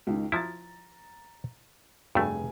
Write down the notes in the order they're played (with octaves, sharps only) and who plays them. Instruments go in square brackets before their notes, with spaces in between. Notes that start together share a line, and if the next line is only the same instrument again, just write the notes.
[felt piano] C#2 D#3
[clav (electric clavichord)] F3 E4 [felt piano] A#5 A6
[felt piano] F1 G#4 G#5 [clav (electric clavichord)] G2 A3